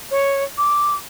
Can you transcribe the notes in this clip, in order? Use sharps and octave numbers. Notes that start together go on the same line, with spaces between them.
C#5
D6